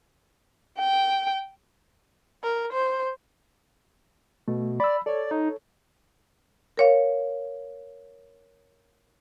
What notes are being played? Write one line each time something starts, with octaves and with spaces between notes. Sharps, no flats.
G5
A#4
C5
B2 A3
D5 B5 E6
A4 C#5 D5
D#4
A#4 C#5 F5